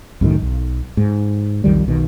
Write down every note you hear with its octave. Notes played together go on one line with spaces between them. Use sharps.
C2 F#2 A2 D#3
B1
G#2
B1 F2 D#3 G3
B1 B2 D#3